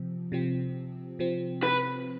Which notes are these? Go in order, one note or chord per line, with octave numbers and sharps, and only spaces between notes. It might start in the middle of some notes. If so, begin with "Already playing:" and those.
Already playing: C3 F3 C4
C3 F3 C4
C3 F3 C4
B4